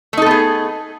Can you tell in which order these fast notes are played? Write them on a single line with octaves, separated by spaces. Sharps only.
A3 D#4 A4 B3 G#4